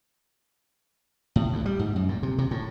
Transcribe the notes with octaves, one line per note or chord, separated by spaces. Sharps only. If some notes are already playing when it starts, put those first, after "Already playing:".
A2
D2
G3
G#2
F#2
A#2
C3
C3
A2